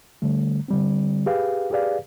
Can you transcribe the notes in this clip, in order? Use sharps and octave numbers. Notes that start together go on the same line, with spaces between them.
D3 G3 A3
D3 G3 C4
G4 G#4 B4 F5
G4 G#4 B4 D5 F5